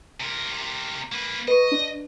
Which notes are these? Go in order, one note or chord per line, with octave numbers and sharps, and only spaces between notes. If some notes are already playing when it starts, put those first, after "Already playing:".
C3 A#4
A#3 B4
B4 D#5 C#6
D4